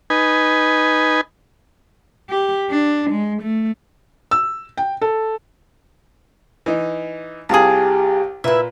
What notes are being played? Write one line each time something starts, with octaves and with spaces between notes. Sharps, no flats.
D#4 B4 G#5
G4
D4
G#3
A3
E6
G5
A4
E3 D#4
C2 F4 G4 G#4 A5 D#6
A#2 E4 B4 E5